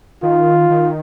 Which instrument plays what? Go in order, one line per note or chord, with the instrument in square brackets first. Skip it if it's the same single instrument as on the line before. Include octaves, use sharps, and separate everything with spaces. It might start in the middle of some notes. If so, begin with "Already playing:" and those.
[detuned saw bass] D#3 [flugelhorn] F4
[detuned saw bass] D#3